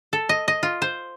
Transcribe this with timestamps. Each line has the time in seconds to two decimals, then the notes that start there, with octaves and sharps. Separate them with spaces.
0.13 A4
0.29 D#5
0.48 D#5
0.63 F4
0.82 C5